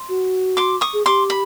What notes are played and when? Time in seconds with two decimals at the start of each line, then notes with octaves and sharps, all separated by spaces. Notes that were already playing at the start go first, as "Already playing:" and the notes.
Already playing: C6
0.09 F#4
0.57 C6 D6
0.81 C#6 D#6
0.93 G#4
1.06 G4 C6 D6
1.30 B5